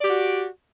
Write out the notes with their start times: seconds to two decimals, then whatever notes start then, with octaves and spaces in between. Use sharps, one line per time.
0.01 D5
0.04 G4
0.07 F#4